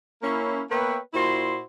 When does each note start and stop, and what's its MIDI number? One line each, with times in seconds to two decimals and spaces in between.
0.22 0.62 58
0.22 0.62 61
0.22 0.62 64
0.70 0.97 58
0.70 0.97 59
0.70 0.97 71
0.70 0.97 73
0.70 0.97 76
0.70 0.97 79
1.14 1.61 46
1.14 1.61 64
1.14 1.61 66
1.14 1.61 72
1.14 1.61 84